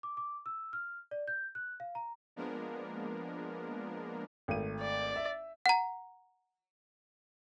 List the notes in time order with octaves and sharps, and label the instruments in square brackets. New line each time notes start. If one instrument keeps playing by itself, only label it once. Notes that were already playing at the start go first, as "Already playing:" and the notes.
[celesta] D6
D6
E6
F6
D5
G6
F#6
F5
A#5
[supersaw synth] F3 G#3 A#3 B3 D4 A#4
[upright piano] G#1 A3 D#7
[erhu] D5
[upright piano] E5
[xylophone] F#5 A#5